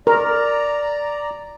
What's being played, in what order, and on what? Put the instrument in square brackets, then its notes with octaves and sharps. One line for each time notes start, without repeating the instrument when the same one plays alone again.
[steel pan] A#4 [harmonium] D5 A#5